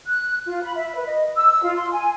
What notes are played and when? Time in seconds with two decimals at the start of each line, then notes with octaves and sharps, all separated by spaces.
0.07 F#6
0.47 F4
0.63 B5
0.76 E5
0.95 B4
1.07 D#5
1.35 E6
1.62 F4
1.76 C6
1.93 G#5